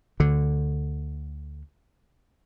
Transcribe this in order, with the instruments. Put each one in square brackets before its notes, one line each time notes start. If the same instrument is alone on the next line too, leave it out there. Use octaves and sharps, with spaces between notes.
[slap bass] D2 D3